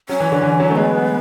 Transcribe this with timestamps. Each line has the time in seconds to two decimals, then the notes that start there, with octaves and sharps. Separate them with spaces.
0.09 F#3 C#4
0.20 E3
0.32 D3
0.43 E3
0.60 F#3
0.70 A3
0.76 G#3 B3